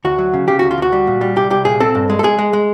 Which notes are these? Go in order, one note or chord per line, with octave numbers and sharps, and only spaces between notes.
D2 F#4
F#3
C#3
C#3 G4
D2 F#4
F4
D2 F#4
G3
A#2
G3
C2 G4
C2 G4
A#2 G#4
C4 A4
G2
G#3
A4
G#3 G#4
G#3
G#3